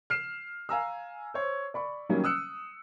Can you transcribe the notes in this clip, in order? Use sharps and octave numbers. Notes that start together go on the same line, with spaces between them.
F6 C7 E7
F5 G#5 A#5 E6
C5 C#5
D5 B5 C#6
D#3 F#3 G3 A#3 C#4
D#6 E6 F#6 C#7